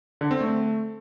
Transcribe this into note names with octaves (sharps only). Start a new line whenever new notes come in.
D3
C4
A3